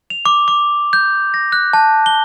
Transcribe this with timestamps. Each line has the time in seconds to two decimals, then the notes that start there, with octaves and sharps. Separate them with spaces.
0.10 F7
0.26 D6
0.48 D6
0.93 G6
1.34 A#6
1.52 F#6
1.73 A5
2.06 G7